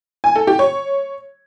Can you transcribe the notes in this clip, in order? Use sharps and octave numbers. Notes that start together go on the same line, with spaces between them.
G#5
A4
G4
C#5